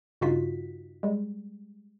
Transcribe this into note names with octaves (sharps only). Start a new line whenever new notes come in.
G2 C#3 D#4 F4 F#4 B6
G3 G#3